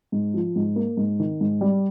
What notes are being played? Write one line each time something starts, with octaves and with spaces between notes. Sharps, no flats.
G#2
F3
G#2
A#3
G#2
D#3
G#2
G3